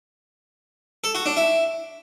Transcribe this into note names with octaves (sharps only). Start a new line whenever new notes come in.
A4
F#4
D4
E4